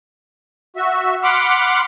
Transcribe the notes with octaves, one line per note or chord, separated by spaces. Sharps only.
F#4 E5
F#5 B5 C6 D6 F6